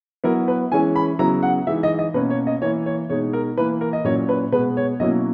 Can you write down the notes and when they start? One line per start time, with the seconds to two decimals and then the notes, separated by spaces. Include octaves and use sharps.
0.24 F#3 B3 E4 A#4
0.48 B4
0.72 E3 G#3 C#4 E4 G#5
0.96 B5
1.19 C#3 F#3 B3 E4 A#5
1.43 F#5
1.67 E3 G#3 D#4 E5
1.83 D#5
1.99 D#5
2.14 B2 A#3 C#4 B4
2.30 C#5
2.47 D#5
2.62 E3 A#3 E4 C#5
2.86 C#5
3.09 B2 G#3 D#4 C#5
3.33 A#4
3.57 E3 A#3 E4 B4
3.81 A#4
3.93 D#5
4.04 A#2 F#3 C#4 E4 C#5
4.29 B4
4.52 B2 G#3 B3 B4
4.77 C#5
5.00 B2 F#3 A#3 C#4 E4 D#5